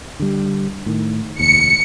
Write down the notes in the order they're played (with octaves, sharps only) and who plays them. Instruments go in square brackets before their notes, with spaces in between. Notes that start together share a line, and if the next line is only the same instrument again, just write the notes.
[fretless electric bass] D3 G3
A2 D#3
[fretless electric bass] F1 D#2 [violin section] C#7